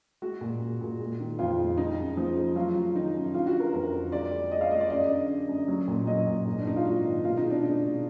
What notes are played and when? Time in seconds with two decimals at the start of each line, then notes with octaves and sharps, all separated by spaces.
0.22 G#3 F#4
0.41 A#2
0.61 G#3
0.81 A#2
1.00 G#3
1.20 D#3
1.39 F2 F4
1.58 G#3
1.77 G#3 D#4
1.98 F#2
2.17 F3
2.36 G#3
2.56 F#3 F4
2.75 F#3
2.95 D#3 D#4
3.14 F#2
3.34 D3 F4
3.47 F#4
3.54 D3
3.60 A#4
3.73 F2 A#4
3.93 D3
4.12 G#3 D5
4.32 G#3
4.51 G#3 D#5
4.61 F5
4.71 G#3 D#5
4.80 D5
4.90 F#2 D#5
5.10 D3
5.29 D3
5.49 F#2
5.68 F#3
5.88 A#2
6.07 F#3 D#5
6.27 A#2
6.47 G#2
6.58 D4
6.65 G#2 D#4
6.76 F4
6.85 G#2 F#4
7.04 D#3
7.25 B2 F4
7.37 D#4
7.44 G#3
7.50 D4
7.63 G#3 D#4
7.83 B2